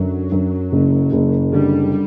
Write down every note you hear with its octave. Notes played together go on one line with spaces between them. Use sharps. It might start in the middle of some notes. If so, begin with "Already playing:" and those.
Already playing: F#2 D3 F#3
F#2
F#1
F#1
D3 G3